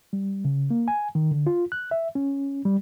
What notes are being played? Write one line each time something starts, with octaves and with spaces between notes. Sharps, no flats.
G3
C#3
A#3
G#5
D#3
D3
F4
F#6
E5
C#4
G3